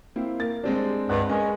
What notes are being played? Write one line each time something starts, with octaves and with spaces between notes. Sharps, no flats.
A#3 C4 E4
A#3 A#4 A6
G3 G#3 C4 D4
C#2 G2 D5 F#5 F#6
G#3 C#4 A#4 B4 D#5